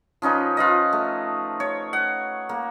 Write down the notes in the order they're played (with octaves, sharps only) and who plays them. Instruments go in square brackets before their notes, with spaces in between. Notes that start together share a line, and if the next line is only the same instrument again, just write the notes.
[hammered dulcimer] F3 C#4 D#4 B4
F4 B4 D#5
A3
C#5
F#5
A#3